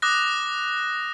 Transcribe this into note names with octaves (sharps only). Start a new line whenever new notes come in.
D6 D#6 F#6 A#6